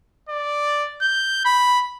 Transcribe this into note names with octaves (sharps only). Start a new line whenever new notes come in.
D5
G6
B5